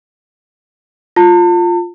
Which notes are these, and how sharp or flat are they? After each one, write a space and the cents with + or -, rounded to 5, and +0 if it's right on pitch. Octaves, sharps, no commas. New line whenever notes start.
F4 +0 A5 +40